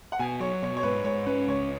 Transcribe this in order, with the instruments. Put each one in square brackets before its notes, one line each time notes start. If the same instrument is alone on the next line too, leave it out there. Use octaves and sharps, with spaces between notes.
[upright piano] F#5
[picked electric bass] B2 [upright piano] G#5
[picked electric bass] F#3 [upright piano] C#5
[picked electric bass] B2 [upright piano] C#5
[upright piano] C#5
[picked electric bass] G#2 [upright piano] B4
[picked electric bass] G#2 [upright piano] C#5
[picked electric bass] C#4 [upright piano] B4
[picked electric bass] C#2 [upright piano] C#5